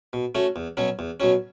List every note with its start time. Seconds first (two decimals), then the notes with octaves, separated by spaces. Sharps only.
0.13 B2
0.35 A3 C#4 F#4
0.56 E2
0.77 B2 F#3 C#4
0.99 E2
1.20 B2 F#3 C#4